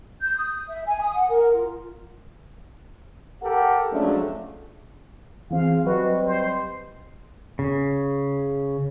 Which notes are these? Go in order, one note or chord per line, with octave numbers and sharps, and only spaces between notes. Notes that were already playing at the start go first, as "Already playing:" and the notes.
G6
D#6
E5
G#5
D#6
F#5
A#4
F4
G4 A4 A#4 F#5
F3 F#3 G#3 A3 C#4 D4
E3 C4 F4 G#4 F5
F#3 G3 C4 F#4 B4 D#5
C5
C#3